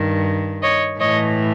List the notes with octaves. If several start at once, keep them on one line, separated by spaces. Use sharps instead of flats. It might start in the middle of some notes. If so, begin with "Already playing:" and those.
Already playing: G2 D#3
C#5 D#5
A2 E3 C#5 D#5